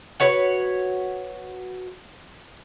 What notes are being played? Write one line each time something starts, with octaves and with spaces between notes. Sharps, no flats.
F#4 B4 C#5 F#5